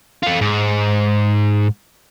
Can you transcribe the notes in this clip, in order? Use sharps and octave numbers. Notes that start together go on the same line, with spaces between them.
F4 A4
G#2